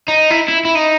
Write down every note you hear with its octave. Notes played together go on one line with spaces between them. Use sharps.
D#4
E4
E4
E4
D#4